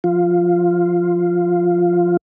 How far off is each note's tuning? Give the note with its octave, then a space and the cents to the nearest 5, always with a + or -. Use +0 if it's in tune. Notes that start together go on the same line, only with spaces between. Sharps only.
F3 +0 F4 +0